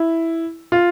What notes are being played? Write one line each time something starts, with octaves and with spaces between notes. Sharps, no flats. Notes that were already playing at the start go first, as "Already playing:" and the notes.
Already playing: E4
F4